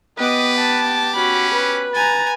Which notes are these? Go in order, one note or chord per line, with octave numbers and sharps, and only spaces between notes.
B3 G4 B4 D#5 D6
A5
C#4 F#4 B5
B4
G#5 A#5 A6